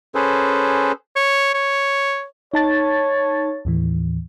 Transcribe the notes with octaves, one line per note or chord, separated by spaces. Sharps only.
C#4 G#4 A4 B4 C5
C#5
C#5
D#4 C#5 A5 A6
D#2 A2 E3